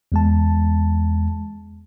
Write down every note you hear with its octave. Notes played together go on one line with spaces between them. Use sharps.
E2 G#3 A5